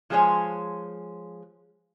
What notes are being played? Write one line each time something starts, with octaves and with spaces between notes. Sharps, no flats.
F3 G#3 G#4 C5 C#5